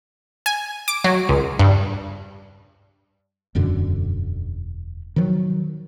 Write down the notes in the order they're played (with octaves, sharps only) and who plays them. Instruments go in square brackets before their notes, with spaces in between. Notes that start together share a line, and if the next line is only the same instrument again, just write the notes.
[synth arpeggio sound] G#5
D6
F#3
C#2
G2
[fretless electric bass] E1 F#2 B2 D3
D#3 F3 F#3